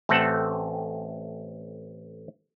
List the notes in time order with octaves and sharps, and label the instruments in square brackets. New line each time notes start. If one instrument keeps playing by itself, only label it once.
[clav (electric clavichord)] A1 A3 C4 A4 F#5